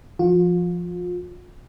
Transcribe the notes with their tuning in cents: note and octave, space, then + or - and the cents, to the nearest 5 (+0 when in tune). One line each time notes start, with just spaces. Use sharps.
F3 -10 F4 +35